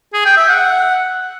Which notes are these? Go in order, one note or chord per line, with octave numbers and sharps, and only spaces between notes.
G#4
G5
E5
F#5